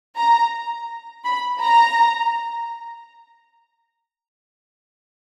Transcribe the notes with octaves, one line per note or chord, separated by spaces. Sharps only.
A#5
B5
A#5